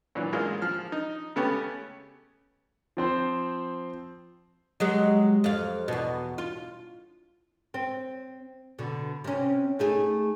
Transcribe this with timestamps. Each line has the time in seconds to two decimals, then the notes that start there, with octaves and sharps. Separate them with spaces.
0.15 A#2 E3 F#3 D4
0.33 A1 G#3 A#3 F4 D#5
0.62 F3 F6
0.92 D#4
1.36 C#3 A3 B3 C#4 G4
2.97 F3 C4 C5
4.80 F#3 G#3 G4
5.44 F2 F5
5.88 E2 B2
6.38 F4
7.74 C4
8.79 B2 D3
9.24 C3 C#4
9.79 A3 D#4 G#4